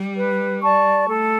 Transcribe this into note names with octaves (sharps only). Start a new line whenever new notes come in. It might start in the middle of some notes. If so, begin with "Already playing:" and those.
Already playing: G3
B4
D5 A5 C#6
A3 A4